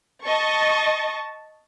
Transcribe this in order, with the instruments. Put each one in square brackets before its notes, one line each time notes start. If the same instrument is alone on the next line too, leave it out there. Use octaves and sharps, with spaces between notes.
[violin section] D#5 A5 C#6